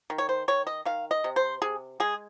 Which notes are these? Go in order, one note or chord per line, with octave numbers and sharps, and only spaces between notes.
D#3
C#5
C5
D#3 C#5
D#5
D#3 F5
D#5
C3
C5
C3 G#4
G#3 G#4